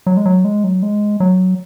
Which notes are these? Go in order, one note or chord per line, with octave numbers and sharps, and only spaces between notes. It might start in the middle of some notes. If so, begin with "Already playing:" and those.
F#3
G#3
F#3
G#3
F#3
G#3
F#3